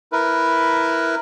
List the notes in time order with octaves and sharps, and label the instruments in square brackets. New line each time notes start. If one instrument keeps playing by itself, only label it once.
[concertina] E4 A#4 B4